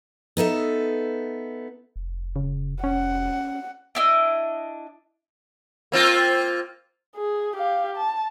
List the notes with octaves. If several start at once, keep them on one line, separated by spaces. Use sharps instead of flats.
B3 D#4 A4 E5
F1
C#3
C#4 F#5
D4 E4 D#5
A#3 C4 F4
G#4
G4 F5
A5